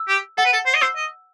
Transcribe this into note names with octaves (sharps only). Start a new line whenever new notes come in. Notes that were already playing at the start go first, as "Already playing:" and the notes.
Already playing: E6
G4
A4 F#5
B4
A4
C5
D#5
C5 E6
D#5